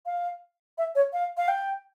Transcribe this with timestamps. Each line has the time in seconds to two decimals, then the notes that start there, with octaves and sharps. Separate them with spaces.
0.06 F5
0.78 E5
0.95 C#5
1.13 F5
1.37 F5
1.48 G5